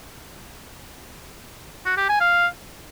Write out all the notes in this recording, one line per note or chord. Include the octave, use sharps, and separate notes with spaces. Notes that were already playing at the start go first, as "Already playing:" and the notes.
F#4
G4
G#5
F5